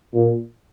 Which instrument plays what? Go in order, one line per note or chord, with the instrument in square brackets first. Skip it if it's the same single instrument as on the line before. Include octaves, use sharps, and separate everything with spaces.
[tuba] A#2